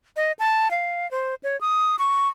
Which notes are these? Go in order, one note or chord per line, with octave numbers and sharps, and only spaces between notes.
D#5
A5
F5
C5
C#5
D#6
C#6